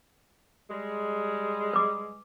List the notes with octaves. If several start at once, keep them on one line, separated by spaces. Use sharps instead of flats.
G3 G#3
B4 D6